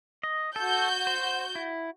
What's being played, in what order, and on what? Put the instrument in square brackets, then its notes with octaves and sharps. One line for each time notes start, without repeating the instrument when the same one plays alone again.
[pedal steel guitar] D#5
[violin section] F#4 G6 [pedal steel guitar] A4
[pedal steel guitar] C5
E4